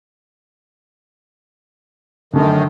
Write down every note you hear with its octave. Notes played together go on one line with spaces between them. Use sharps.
F#2 D3 D#3 A3